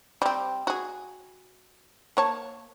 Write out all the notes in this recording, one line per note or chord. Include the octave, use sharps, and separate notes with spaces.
G3 C4
F#4 G#4
A#3 C#5 A5